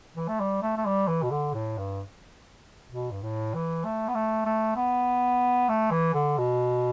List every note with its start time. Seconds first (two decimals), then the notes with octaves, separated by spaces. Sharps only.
0.16 E3
0.28 A3
0.40 G3
0.62 A3
0.77 A3
0.85 G3
1.08 E3
1.23 B2
1.31 D3
1.54 A2
1.78 G2
2.92 B2
3.11 G2
3.23 A2
3.54 E3
3.85 A3
4.08 B3
4.15 A3
4.46 A3
4.76 B3
5.68 A3
5.91 E3
6.14 D3
6.38 B2